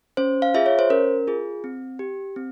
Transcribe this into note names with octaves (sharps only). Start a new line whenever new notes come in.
C#4 C5
F5
F4 G#4 E5
C#5
C5
C#4 A#4
F4 G#4
C4
G4
C4